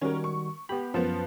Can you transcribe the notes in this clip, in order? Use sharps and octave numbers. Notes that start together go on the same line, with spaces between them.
D#3 G3 C#4 F#4 A#4
C#6
B3 G4 B5
F#2 F3 B3 A5